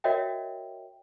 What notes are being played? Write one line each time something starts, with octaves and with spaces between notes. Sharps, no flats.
F#4 A#4 C#5 D#5 E5 G5